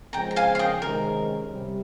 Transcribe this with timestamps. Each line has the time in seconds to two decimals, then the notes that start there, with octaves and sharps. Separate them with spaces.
0.13 C#3 F3 G#3 C4 G5 A#5
0.31 A#5
0.36 F5 G#5
0.55 F5
0.59 D#5 G5
0.82 C3 D#3 G#3 C#4 A#4
1.51 C3 G3